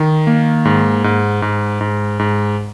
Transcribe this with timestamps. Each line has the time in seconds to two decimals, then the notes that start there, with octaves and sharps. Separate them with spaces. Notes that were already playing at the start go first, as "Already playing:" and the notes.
Already playing: D#3
0.27 A#3
0.65 G#2
1.04 G#2
1.42 G#2
1.81 G#2
2.19 G#2